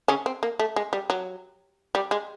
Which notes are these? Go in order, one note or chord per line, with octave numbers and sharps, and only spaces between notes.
C#3 C#4
C4
A#3
A3
G#3
G3
F#3
G3
G#3